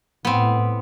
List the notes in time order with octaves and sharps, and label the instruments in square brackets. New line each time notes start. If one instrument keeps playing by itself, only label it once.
[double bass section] A2 [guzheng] B3 C4